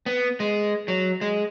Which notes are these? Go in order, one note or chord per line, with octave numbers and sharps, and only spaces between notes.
B3
G#3
F#3
G#3